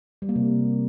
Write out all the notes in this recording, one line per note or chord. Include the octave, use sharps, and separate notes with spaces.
G3
A#3
C3